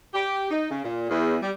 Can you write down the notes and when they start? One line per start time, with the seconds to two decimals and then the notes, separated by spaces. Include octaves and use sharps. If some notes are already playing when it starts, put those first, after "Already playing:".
0.13 G4
0.51 D#4
0.70 C#3
0.85 A#2
1.10 E2
1.42 G3